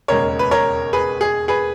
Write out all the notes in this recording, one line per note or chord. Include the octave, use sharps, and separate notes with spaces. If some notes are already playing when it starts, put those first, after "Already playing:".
E1 D#2 C#3 G#3 A#4 C#5
B4
A#4 C#5
G#4 B4
G#4
G#4 B4